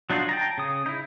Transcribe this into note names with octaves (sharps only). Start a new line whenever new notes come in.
F#3 D4 D#4 F4 F#4
G5 A5 A#5
C#3 D#6
D#4 E4